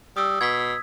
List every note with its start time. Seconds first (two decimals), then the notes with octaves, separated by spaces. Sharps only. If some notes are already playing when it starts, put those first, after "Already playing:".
0.17 G3 D#6 E6
0.41 B2 G#6 B6